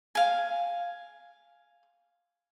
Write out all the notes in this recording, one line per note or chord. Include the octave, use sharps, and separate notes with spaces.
F5 G#5